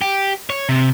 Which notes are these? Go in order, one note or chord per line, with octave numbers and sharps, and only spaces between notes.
G4
C#5
C3